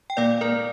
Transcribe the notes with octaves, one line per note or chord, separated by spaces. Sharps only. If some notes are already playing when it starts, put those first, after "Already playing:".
G5
A#2 D5 F5
A#3 A#4 D5